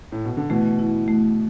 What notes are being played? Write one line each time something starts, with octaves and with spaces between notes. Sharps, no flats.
A2
B2
D3
B2 E3 A3
E4
A3